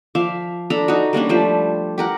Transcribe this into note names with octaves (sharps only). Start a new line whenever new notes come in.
F3 E5 F5 D6
D4 A4 A#5 B5
D#4 F#4
G3 A#3 C#4 D4
F3 G3 A3 C5
G4 A#4 F#5